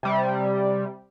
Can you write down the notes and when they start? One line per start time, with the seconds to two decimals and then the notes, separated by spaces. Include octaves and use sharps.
0.03 C3 G3